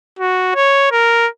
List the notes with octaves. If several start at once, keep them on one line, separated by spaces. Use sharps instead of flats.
F#4
C#5
A#4